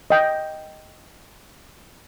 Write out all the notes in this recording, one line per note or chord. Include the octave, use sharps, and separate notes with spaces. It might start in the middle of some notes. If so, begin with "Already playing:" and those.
D#5 G5